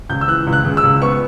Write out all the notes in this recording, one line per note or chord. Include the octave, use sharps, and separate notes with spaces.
C#2 G6
E6
E3 F#6
C#2
F#6
C#3
E6
C#2
B3 C#6